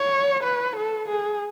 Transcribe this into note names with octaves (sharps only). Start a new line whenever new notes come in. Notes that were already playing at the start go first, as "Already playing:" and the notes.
Already playing: C#5
B4
A4
G#4